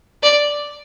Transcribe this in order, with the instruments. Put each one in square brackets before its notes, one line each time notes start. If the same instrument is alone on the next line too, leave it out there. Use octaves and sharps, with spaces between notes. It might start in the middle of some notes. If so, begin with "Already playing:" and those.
[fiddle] D5